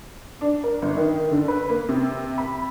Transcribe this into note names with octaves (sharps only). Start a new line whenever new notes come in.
D4
A#4
G1
D#3
D3
B4
A#3
C3
B5